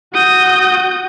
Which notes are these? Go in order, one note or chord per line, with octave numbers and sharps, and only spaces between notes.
F#4 D#6 G6